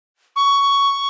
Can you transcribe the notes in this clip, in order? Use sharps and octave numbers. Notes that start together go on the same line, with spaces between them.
C#6